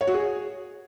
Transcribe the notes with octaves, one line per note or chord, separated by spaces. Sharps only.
C#5
F#4
G#4